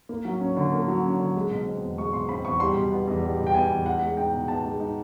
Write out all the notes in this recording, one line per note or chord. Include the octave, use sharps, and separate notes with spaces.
A#3
F#3
C#4
D3
A#3
F#3
C#4
D3
G#3
B2
C4
E2
G#3 C#6
B2 C6
C4 B5
E2 C#6
G3 C6
B2
B3
E2
G3
B2
G5
B3 G#5
E2
B3 F#5
G#3
D#4 G5
B2
B3 A5
G#3
D#4